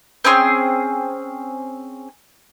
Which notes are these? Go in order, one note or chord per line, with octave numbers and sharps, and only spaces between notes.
C4 C#4 G#4 C6